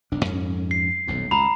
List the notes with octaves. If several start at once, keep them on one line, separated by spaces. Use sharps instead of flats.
E1 B1 D4
F2 G#2 C#4
C7
D#1 B1 F2
C#2 A#5 B5